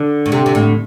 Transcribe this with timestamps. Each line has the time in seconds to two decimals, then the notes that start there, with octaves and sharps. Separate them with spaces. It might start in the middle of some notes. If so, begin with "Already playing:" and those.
Already playing: D3
0.26 A2
0.32 C3
0.46 C3
0.55 A2